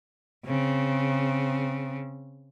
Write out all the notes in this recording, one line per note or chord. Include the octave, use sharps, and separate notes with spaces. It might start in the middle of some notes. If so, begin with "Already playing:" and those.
C#3 C4